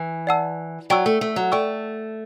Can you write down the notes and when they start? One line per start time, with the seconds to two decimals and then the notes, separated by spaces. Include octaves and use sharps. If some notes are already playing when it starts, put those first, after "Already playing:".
Already playing: E3
0.27 D5 F#5 A5 E6
0.90 F#3 D5 G5 C#6 E6
1.06 A3
1.21 A3
1.36 F#3
1.52 A3 D5 G5 C#6 E6